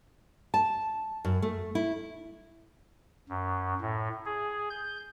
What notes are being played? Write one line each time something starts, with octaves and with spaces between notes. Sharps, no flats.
A5
F#2
A3
E4
F#2
A2
G#4
G6